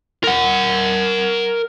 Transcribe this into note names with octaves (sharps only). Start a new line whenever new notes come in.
A#4 F#5